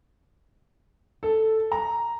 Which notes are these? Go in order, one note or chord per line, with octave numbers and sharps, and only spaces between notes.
A4
A#5